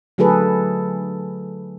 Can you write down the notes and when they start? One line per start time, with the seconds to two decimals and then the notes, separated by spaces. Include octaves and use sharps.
0.18 D3 F#3 A3 G#4 A4 B4